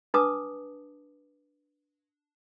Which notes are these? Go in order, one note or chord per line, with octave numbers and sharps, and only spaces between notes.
D4 B4 A5 D6 D#6